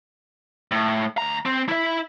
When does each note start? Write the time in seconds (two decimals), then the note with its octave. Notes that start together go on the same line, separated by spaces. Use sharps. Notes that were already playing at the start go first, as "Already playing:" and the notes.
0.72 A2
1.18 D2 A#5
1.45 C4
1.68 E4 E5